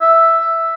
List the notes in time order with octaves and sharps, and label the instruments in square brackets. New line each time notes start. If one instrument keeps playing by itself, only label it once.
[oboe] E5